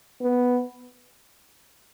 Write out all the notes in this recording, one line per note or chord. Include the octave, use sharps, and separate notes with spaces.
B3